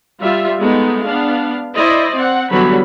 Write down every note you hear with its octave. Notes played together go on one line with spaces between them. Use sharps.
G3 F4 E5
G#3 A3 B3 D#4
B3 D4 F5
E4 C5 D5 D#5
C4 F#5
D3 E3 F#3 G3 B3 B5